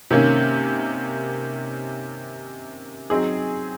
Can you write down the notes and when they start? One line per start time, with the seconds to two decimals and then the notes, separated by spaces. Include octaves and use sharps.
0.11 C3 D#3 A#3 C#4
3.10 F#3 C4 D#4 G#4